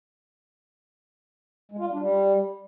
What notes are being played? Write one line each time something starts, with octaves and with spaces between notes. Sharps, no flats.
G#3
F4
G3
D4
G3